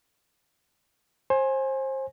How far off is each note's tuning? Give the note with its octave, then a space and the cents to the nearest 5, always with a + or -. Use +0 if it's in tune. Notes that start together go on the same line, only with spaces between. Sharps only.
C5 +30 G#5 +0